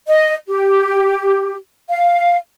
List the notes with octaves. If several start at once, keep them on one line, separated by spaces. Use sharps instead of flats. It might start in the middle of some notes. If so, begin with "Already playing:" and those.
D#5
G4
F5